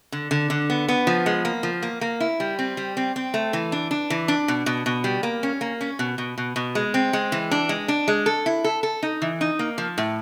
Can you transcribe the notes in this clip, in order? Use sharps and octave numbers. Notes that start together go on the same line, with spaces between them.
D3
D3
D3
B3
B3
F3
G#3
A#3
F3
A#3
A#3
E4
G3
C4
G3
C4
C4
A3
E3
D4
D4
E3
D4
B2
B2
B2
G3
A#3
C#4
A#3
C#4
B2
B2
B2
B2
G#3
C4
G#3
E3
D4
G#3
D4
G#3
A4
E4
A4
A4
D#4
E3
D#4
A#3
F3
A2